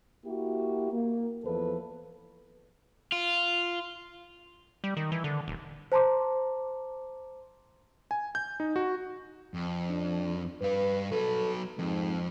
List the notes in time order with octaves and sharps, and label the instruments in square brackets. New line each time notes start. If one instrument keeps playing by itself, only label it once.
[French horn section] A#3 E4 F#4 G4
A#3
E2 F3 A4 B4
[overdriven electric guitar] F4
[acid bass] G3
D#3
E3
D3
D#1
[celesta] C5 A5 A#5 C6 D6
[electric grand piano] G#5
G6
D#4
F#4
[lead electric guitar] F2
[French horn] D4
[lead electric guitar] G2 F5 [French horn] B4
[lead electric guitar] F#3 B4 [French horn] A4
[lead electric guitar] F2 [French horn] G#2